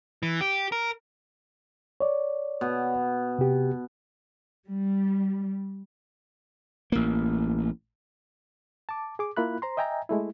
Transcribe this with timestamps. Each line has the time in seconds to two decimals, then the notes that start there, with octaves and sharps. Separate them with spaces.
0.23 E3
0.41 G4
0.72 A#4
2.00 C#5 D5
2.61 B2
3.39 C3 G4
4.69 G3
6.92 A1 A#3
8.89 A5 D6
9.19 G#4 D6
9.37 A#3 E4 F4 B5 F#6
9.62 C5 A#5 C6
9.77 D#5 E5 G5 G#5 A#5
10.09 G#3 A3 E4